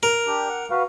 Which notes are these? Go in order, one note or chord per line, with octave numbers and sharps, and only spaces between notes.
A#4
D4 G4
F#5
F#4 B4 F5